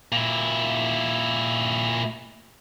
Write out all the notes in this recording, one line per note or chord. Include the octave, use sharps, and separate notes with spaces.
A#2 E4